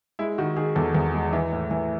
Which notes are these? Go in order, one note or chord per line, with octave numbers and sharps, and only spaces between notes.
G#3 E4
D#3 F#4
D#3 G#4
E2 A4
E2
G#3
E3
A2
E3